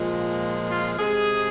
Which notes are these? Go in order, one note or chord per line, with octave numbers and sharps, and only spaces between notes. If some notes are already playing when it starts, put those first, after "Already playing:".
Already playing: A#2 F3 G#3
F4
C3 G#3 G#4